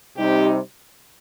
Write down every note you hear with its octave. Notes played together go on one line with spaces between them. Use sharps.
C3 G3 C4 D#4 G4